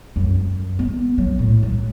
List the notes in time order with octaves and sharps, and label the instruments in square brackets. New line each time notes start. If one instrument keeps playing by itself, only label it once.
[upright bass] F#2
B3
F#3
A2
F#3